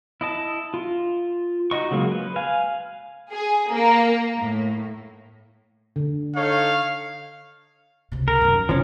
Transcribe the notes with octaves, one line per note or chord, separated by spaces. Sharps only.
E4 D#5 A5
F4
D#4 F#4 D#5 C#6
C#3 F#3 G#3 A#3
B4
F5 G#5
G#4
A#3
A2
D3
D#4 A4 C#5 F5
C#2 C3
A#4
F#2 D#3
C3 E3 F3 C#4